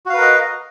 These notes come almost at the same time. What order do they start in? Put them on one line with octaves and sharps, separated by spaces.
F#4 F5 B4 A#4 D#5